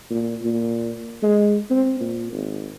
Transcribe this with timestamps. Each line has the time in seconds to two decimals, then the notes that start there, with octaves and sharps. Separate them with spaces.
0.10 A#2
0.42 A#2
1.23 G#3
1.70 C4
2.00 A#2
2.32 G#1